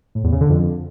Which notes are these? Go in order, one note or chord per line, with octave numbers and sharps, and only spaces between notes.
A2
E2
C#3
D3
F2